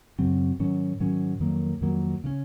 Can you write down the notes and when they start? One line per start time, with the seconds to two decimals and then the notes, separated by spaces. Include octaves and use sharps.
0.19 F#2 C#3 F#3 C4
0.59 G#2 D#3 F#3 C#4
1.00 G#2 D#3 F#3 C#4
1.40 F2 D#3 F#3 A#3
1.81 F2 D#3 F#3 A#3
2.24 C#3 G#3 C#4